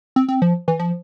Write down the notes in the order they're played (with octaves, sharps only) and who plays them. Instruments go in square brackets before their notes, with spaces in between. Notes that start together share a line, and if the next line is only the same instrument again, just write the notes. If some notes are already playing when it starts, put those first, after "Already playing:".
[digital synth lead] C4
C4
F3
E3
F3